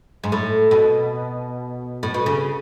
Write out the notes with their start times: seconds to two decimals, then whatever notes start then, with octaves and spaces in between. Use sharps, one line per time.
0.24 G#2
0.32 A2
0.71 B2
2.03 A2
2.14 B2
2.26 C#3